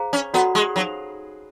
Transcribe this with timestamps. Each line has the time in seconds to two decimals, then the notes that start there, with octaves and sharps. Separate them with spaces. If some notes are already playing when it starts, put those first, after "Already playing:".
Already playing: G#4 C5 F5 A#5
0.13 C#4
0.34 B3 F#4 A4 D5 F#5 A#5
0.55 G#3
0.76 F#3 D#4 G4 C5 F5